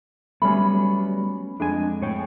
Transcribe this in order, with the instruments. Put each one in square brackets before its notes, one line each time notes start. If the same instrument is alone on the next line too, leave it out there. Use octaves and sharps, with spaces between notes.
[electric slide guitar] F#3 G3 B3 [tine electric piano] A3 C#4 [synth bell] B5
[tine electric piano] F2 G#3 G#5 [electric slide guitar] D4
[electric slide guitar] A2 C#5 G5